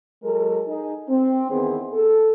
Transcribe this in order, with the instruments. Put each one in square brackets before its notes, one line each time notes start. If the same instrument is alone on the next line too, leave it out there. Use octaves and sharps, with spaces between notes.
[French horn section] F#3 G#3 A4 A#4
D#4 G#4
C4
E2 D#3 B3 G#4 C5
A4